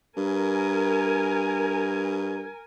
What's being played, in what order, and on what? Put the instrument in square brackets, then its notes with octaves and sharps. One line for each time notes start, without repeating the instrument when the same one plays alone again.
[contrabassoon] G2 [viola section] A#4 G#5